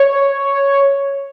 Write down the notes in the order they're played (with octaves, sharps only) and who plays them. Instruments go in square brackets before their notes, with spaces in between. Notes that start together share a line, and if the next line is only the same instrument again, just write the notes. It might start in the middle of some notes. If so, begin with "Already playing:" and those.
Already playing: [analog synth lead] C#5